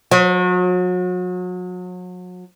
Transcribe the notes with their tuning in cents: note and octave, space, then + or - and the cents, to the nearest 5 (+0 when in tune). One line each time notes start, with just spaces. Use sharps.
F#3 -35